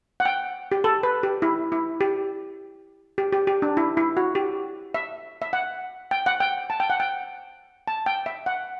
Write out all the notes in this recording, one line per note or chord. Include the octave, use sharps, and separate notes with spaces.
F#5
G5
G4
A4
B4
G4
E4
E4
G4
G4
G4
G4
D4
E4
E4
F#4
G4
E5
E5
F#5
G5
F#5
G5
A5
G5
F#5
G5
A5
G5
E5
F#5